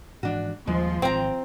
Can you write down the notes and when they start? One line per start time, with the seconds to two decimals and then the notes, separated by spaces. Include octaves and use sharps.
0.23 G#2 E3 F3 D4 F#4
0.67 D#2 F3 G3 G#3 A#3
1.02 G#1 C4 G5 A#5